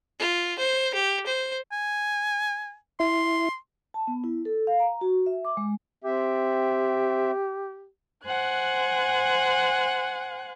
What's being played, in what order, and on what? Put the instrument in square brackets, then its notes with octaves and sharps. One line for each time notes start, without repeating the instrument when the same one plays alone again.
[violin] F4
C5
G4
C5
[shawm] G#5
[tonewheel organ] E4 [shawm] C6
[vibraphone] A5
B3
E4
A4
F5
A#5
F#4
E5
D6
G#3
[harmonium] C4 E5 [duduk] G4
[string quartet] C5 F#5 G#5 F#6